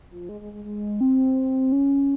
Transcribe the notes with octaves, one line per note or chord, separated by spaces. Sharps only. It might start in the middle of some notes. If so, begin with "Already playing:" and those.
F3
G#3
G#3
G#3
G#3
C4
C#4